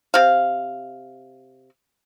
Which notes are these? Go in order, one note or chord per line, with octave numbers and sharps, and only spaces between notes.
C3 F5